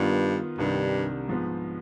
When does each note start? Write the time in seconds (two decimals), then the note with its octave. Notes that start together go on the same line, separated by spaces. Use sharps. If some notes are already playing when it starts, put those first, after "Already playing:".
Already playing: G2 D#3 B3 F4
0.58 C2 G2 C3 D#3 G3 D4
1.28 G#2 F3 B3